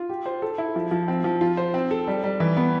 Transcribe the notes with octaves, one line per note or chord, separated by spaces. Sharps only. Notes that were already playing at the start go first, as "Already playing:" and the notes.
Already playing: F4
G4
C5
A4
E4
F3
F3
C4
F3
F4
C5
C4
A4
G3
G3
E3
B3